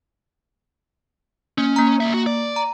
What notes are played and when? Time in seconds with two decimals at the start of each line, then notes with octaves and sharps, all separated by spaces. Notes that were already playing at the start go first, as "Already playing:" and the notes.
1.58 A#3 C#4
1.76 A#3 A#5
2.01 G3 E5
2.14 F#4
2.26 D5
2.56 A#5